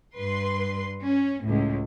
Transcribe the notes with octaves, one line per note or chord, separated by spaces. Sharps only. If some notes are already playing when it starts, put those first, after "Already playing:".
G2 B4 C6
C#4
C#2 A2